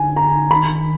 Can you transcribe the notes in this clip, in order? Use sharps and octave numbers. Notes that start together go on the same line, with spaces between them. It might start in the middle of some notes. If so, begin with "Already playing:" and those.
Already playing: D3 G#5
A#5
D#3 B5